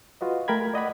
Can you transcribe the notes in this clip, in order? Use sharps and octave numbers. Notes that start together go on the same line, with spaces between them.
F4 F#4 B4 D#5
A3 A#4 G5 B5 G#6
D5 D#5 F#5 B5